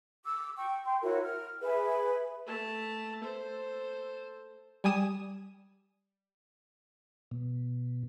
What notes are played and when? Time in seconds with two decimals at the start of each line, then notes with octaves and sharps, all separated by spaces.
0.24 D6 E6
0.57 G5 C#6
0.85 G5 C6
1.02 E4 F#4 A#4 C#5
1.23 F6
1.61 G#4 B4 E5
2.47 A3 A5
3.24 A4 C5
4.84 G3 G#5 D#6 E7
7.31 B2